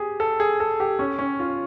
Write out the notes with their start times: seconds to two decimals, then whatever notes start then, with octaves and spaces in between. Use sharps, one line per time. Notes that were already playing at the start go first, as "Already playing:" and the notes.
Already playing: G4 G#4
0.20 A4
0.40 G#4
0.60 A4
0.80 G4
0.99 C#4
1.19 C#4
1.40 F4